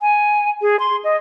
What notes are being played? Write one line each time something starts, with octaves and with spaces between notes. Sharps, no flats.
G#5
G#4
C6
D#5